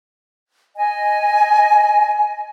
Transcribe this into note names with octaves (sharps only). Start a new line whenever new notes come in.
D#5 G#5